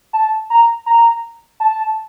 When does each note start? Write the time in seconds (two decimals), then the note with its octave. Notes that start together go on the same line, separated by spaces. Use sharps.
0.13 A5
0.50 A#5
0.86 A#5
1.60 A5